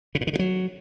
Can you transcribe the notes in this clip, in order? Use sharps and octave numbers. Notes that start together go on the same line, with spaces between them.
C#3
A#2
D#3
D3
F#3